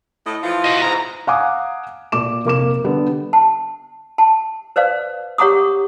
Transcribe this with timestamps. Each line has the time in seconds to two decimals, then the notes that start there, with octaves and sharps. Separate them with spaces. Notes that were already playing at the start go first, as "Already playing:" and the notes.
0.26 A2 D#5
0.43 E3 F3 F4
0.64 F#4 D#5
0.82 E2 G#2 A#5
1.27 F5 F#5 G#5 A#5 D6 D#6
2.12 A#2 D6 E7
2.45 F1 A#3 D6 E7
2.84 D3 G3 B3
3.33 A5
4.18 A5
4.76 B4 C5 D5 F5
5.38 G4 C#5 F#5 A#5 D6 D#6